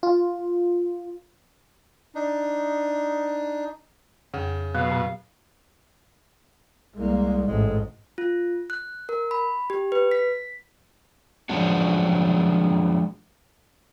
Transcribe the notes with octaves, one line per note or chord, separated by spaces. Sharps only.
F4
D4 D#4
F2 C#3 G5
B2 F#3 F5
A#2
C2 G#3 A#3
A1 G#2 G#3
F4
F#6
A#4
B5
G4
B4
B6
F3 F#3 G#3 C#4 D4 F#4